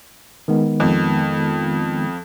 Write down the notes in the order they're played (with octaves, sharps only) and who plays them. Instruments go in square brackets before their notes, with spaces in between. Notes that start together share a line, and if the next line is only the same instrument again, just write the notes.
[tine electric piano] D#3 G#3 B3
[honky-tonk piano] F2